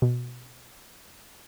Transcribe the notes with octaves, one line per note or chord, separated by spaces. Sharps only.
B2